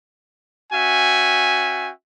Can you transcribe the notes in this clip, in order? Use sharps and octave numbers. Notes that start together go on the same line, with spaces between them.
C#4 F#4 E5 G5 G#5